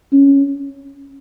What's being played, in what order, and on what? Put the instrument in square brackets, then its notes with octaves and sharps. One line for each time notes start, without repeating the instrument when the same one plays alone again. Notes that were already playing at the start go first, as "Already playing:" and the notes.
[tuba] C#4